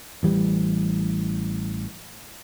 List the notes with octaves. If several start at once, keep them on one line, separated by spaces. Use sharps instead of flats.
A1 E3 G3